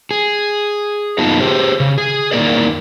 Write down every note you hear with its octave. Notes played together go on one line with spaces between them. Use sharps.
G#4
F#2 A#3 B3 D#4 F4 A5
G4 G#4 C5
C#3
G#4
E2 D#3 A#3 A#4 D5